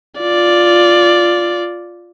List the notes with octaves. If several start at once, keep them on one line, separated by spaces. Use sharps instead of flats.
F4 D5